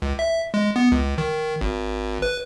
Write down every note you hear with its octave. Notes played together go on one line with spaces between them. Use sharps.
C#2
E5
G#3
B3
C#2
D#3
G#1
B4